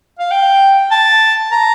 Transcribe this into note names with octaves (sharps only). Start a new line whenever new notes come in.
F5
G5
A5
A#5